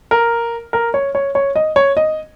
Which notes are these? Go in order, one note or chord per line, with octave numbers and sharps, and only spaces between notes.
A#4
A#4
C#5
C#5
C#5
D#5
C#5
D#5